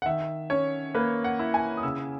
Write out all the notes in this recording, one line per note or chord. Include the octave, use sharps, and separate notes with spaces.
F#5
D#3 E5
C#4 C#5
A#3 B4
F#5
E4
G#5
D#6
C#3 E6